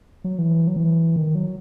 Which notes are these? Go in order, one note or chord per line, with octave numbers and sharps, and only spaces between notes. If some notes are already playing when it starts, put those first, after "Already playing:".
F#3
E3
F#3
E3
D#3
F#3